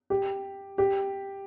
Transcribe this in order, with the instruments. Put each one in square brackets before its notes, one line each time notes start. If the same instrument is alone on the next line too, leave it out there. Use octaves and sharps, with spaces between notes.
[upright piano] G4
G4